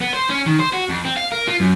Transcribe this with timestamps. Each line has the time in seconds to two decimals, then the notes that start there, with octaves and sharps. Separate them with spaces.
0.01 B3
0.13 C5
0.29 C#4
0.46 D#3
0.59 C5
0.73 F#4
0.89 F2
1.05 C4
1.17 F5
1.32 A#4
1.48 F4
1.60 F#2